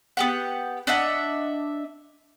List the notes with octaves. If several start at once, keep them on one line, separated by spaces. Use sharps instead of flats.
B3 G4 F#5
D4 D#5 E5 F#5